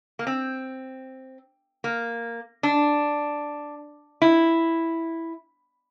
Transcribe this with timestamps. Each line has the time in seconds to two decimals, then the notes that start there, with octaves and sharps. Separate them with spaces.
0.19 A#3
0.27 C4
1.84 A#3
2.63 D4
4.22 E4